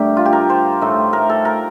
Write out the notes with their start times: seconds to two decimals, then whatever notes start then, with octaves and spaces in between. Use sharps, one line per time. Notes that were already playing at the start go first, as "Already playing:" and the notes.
Already playing: G2 D3 A3 G4 A#4
0.17 F4
0.25 G4
0.33 A#4
0.50 C5
0.81 A2 A3 D#4
1.13 A#4
1.29 A4
1.45 A#4